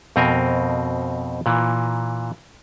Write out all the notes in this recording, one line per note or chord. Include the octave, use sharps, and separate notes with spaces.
F2 B2 C4 A#4 G#5
A#2 E3